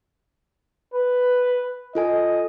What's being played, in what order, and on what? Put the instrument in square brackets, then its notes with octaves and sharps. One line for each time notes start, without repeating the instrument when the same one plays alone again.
[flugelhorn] B4
[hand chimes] F4 A4 G#5 [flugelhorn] D#5